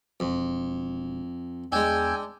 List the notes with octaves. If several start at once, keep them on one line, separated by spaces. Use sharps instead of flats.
E1 F2
E2 G#3 D4 G5 G#5 E6